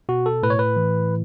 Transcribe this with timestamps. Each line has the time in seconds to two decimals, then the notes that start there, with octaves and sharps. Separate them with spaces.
0.09 B2 F#4
0.26 A4
0.43 A2 B4
0.50 C#5
0.59 B4
0.77 E3